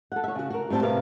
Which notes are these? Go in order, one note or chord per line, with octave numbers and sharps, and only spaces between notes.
A4 F#5
C#5 E5
C#3 F#4
F#4 A#4
A2 G3 C4 E4 A5
A2 C3 A#4 B4 F5